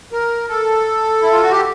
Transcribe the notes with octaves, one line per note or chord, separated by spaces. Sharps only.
A#4
A4
E4
F4
F#4
G4